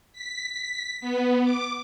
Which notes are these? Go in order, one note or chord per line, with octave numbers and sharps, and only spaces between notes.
B6
B3
D6